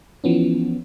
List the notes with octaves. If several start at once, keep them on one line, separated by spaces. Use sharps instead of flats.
E3 F3 B3 C#4